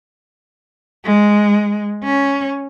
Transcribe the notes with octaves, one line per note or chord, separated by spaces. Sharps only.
G#3
C#4